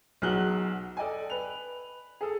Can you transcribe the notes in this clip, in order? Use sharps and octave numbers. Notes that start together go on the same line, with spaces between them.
B1 F#3 G#4 F#6 F#7 G7
A4 D5 D#5 G5 G#5
B4 F7
G#4 A4